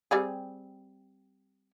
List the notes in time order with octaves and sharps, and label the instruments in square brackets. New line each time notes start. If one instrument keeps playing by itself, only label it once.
[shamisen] G3 C4 G#4